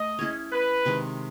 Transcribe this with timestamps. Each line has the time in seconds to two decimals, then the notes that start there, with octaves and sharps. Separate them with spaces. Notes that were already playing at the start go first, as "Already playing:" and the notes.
Already playing: A3 D#5
0.19 C#4 E4 G#4 C#5
0.52 B4
0.85 C3 D#3 G#3